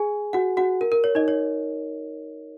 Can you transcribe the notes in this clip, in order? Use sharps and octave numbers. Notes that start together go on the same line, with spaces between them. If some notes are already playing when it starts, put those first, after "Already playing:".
Already playing: G#4 G#5
F#4 F#5
F#4 F#5
A#4
A#4
C#5
D#4 D#5
C#5